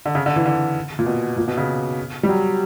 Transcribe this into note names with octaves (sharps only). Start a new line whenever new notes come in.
D3
C#3
D3
E3
D3
A#2
B2
A#2
B2
C#3
G3
F#3